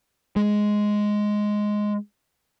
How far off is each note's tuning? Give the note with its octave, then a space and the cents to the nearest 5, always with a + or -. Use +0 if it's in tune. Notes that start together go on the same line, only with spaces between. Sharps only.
G#3 +5